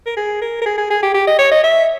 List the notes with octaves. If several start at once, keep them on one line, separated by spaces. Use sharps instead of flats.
A#4
G#4
A#4
A#4
G#4
G#4
G#4
G4
G4
D#5
C#5
D#5
E5